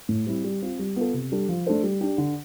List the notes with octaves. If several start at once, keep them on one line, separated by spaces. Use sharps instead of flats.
A2
G3 C4 E4
G3
C4 F4
G3
B3 F4 A4
C3
G3 D4 A4
F3
A3 D4 A4 C5
G3
D4 G4
D3